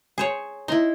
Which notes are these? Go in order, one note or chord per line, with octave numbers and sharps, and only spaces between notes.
G#4 C5 C#5
D#4 E4 A#5 C6